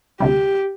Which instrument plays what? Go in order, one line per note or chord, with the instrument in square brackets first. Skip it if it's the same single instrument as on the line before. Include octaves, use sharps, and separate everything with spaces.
[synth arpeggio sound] D2 C3 G3 [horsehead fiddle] G4